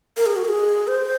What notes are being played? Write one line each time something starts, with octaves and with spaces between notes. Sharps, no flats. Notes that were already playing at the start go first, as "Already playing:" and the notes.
A#4
G#4
F#4
A#4
G#4
C5